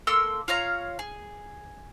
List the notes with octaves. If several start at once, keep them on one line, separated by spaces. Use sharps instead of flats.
A#3 A4 C6 E6
F4 C#5 F5 A#5
G#4